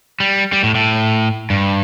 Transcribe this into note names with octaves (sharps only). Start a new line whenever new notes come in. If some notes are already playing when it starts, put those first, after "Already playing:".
G3
G3
A2
A2
G2